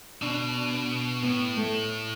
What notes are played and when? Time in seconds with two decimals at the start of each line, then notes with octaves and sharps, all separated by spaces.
0.22 B2 D4
0.56 D4
1.22 A2 B3
1.56 A3